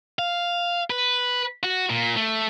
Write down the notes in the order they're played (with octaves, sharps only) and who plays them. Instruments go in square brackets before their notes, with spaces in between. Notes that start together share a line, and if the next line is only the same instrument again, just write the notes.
[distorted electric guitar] F5
B4
F#4
A#2
A3